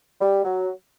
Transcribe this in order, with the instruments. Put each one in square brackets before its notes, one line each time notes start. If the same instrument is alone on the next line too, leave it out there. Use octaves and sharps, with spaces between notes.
[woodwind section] G3
F#3